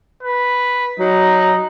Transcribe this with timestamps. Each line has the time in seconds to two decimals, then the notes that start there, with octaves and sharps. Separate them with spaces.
0.23 B4
0.99 F#3 D#4